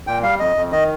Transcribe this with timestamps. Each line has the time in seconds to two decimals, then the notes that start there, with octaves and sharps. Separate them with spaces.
0.07 A#2 G5
0.23 G3 F5
0.40 F2 D#5
0.56 F2
0.72 D#3 D#5